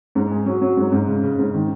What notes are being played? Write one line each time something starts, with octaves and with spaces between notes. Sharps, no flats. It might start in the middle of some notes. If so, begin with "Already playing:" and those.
G#2
G#4
F#3
F#3
G#2
G#2
C#3
C#3
G#2
D#3